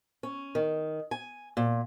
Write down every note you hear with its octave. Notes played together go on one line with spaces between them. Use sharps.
C#4
D#3
G#5
A#2